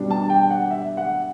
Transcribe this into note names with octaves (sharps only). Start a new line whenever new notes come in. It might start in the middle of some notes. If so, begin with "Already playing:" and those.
Already playing: B2 G3 D4
A5
G5
F#5
E5
F#5